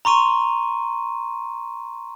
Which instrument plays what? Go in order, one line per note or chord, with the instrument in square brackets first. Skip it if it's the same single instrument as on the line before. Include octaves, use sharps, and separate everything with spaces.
[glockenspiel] A#5 C6 C#6 D#7